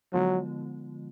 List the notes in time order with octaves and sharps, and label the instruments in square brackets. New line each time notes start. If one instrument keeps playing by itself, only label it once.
[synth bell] D3 F3 G#3 B3 F4 [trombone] F#3